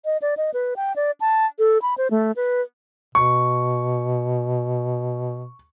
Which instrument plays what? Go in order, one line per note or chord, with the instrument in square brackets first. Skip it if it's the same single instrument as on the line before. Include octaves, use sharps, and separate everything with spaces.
[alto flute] D#5
D5
D#5
B4
G5
D5
A5
A4
B5
C5
A3
B4
[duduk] B2 [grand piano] C#6